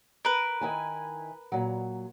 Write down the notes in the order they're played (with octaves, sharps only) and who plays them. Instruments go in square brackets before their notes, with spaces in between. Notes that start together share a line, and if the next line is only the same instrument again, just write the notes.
[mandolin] A#4 B4
[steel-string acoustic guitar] D#3 E4 G#5
A#2 F#3